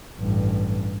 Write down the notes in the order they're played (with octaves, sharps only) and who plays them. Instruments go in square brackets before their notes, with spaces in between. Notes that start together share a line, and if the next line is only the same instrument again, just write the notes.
[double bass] A1 G2